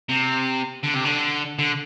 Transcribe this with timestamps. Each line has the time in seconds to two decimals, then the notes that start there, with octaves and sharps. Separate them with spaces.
0.09 C3
0.84 D3
0.95 C3
1.05 D3
1.59 D3